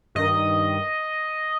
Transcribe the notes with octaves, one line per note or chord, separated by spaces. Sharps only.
G2 D#3 D#5